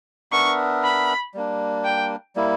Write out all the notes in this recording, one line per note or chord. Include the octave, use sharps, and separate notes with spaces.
B3 D4 A#4 E5 C#6
B5
G3 A#3 D4
G5
G3 A#3 E4